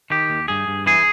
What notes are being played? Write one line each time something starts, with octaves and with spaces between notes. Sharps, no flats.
D#3 G4
D#2
G2 G#4
G2
E3 G#4